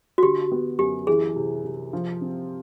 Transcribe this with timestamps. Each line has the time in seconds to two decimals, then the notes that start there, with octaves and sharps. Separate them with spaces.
0.18 F#4
0.23 D3 G4
0.52 B3
0.79 F#2 G4
1.07 E3 G#4
1.36 C3
1.64 C3
1.93 F3
2.21 C4